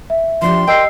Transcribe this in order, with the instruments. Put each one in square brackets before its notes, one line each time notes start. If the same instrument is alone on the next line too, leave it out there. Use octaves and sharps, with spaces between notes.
[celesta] E5
[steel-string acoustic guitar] F3 D4 G4 [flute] C6
[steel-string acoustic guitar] A#4 [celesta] D#5 E6 C7 [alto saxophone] G5